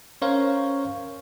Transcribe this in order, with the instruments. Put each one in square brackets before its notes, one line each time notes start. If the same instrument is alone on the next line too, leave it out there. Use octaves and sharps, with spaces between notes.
[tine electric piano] C#4 A#4 C5 C#5 F5